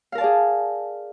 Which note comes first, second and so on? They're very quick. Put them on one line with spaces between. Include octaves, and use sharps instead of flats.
F5 A#4 A5 D5 G#4